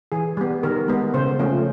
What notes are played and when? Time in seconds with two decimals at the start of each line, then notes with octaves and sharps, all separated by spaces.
0.12 E3 G#4
0.37 G3 B3
0.63 D#3 A#4
0.88 G#3 B3
1.14 C#3 C5
1.39 F3 A3 C#4